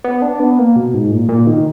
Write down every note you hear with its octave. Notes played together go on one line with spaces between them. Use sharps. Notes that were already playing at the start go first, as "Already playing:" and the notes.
B3
D4
B3
A#3
B2
G#2
A#2
A#2
D#3